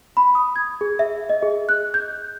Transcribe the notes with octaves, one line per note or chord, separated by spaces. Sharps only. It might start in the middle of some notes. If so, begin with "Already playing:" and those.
B5
D#6
G#6
G#4
E5
D#5
G#4
F#6
G6